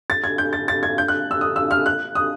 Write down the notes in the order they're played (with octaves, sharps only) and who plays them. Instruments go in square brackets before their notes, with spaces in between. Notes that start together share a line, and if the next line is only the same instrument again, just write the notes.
[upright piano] A6
G#6
G6
A6
A6
G#6
G6
F#6
E6
D#6
E6
F6
F#6
D#6